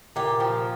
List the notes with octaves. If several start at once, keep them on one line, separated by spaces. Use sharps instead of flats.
A#2 G4
F3